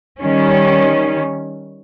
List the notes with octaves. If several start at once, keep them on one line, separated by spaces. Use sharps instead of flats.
D#3 G3 C#4